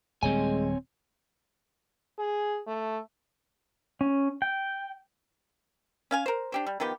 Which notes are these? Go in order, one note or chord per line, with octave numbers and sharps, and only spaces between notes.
D#1 G3 G#3 C4 C#5 G#5
G#4
A3
C#4
G5
C#4 F5 G#5
A#4 C5
D4 G4 C5
G3
D#3 F3 B3 G4